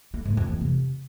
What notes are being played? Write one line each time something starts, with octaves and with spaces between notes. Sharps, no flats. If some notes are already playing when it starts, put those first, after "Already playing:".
A3
G#2
F2
E3
C3